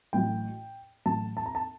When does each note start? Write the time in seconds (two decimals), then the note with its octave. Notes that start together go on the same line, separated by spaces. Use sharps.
0.13 A1 A2 F#3 G5
1.06 A1 A2 F#3 A5
1.37 A5
1.46 A#5
1.55 A5